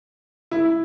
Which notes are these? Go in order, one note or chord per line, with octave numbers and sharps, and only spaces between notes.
E4